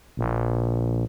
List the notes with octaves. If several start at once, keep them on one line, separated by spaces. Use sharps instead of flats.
A#1